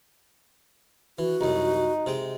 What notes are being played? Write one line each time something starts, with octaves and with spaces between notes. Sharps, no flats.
E3 F#4
C2 F#2 D#4
C3 G#3 G5